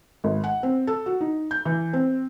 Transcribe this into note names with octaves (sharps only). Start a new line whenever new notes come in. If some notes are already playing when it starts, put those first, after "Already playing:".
G#1
F#5
C4
A4
F#4
D#4
G6
E3
C4